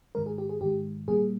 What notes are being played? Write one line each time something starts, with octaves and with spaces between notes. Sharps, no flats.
G#2 D#3 G#3 A#4
G#4
G4
G#4
G#2 D#3 G#3 G4
A#2 G3 A#3 G#4